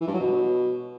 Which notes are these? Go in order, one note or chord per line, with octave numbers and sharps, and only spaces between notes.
E3
G2
F#3
B2